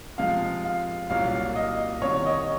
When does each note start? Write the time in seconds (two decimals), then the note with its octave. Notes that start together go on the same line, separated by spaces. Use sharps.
0.18 C3 F3 G#3 F5
0.64 F5
1.10 C2 A#2 F#3 C#4 F5
1.55 D#5
2.01 C2 C3 D#3 C#5
2.25 D#5